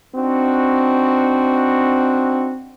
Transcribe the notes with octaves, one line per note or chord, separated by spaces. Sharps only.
C4 D4 D#4 F#4